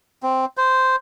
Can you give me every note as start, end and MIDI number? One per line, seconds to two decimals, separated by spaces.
0.23 0.45 60
0.57 0.96 72